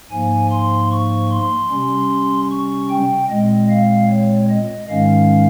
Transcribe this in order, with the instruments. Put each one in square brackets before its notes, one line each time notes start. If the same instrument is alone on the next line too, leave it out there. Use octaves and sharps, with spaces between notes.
[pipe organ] G#2 F3 A#3 G#5
C6
C#6
C6
C3 G3 C#4
C#6
G5
A#2 G#3 C4 D#5
F5
C#5
D#5
G#2 D#3 G#3 C#4 F5